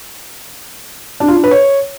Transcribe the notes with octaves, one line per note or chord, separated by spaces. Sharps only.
D4
F4
D4
B4
C#5